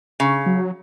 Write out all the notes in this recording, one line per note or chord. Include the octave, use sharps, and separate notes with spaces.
C#3
F#3